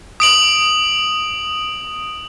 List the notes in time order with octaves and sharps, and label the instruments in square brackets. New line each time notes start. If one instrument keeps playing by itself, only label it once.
[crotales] D#6 D7 F#7